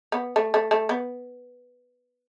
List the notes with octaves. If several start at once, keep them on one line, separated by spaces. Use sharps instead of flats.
B3
A3
A3
A3
B3